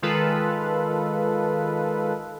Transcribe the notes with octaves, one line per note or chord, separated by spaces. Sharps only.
D#3 G#3 F4 A4 B4